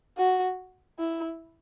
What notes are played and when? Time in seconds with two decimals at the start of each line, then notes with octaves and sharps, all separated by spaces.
0.17 F#4
0.99 E4